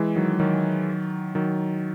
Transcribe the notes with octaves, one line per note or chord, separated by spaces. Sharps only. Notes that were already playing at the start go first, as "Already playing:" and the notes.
Already playing: E3 G#3
D#3 F#3
D#3 F#3
D#3 F#3